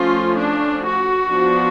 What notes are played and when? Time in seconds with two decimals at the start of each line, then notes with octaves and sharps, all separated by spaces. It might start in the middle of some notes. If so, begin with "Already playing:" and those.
Already playing: F3 A3 C#4 F4
0.37 D4
0.83 F#4
1.29 F3 B3 D4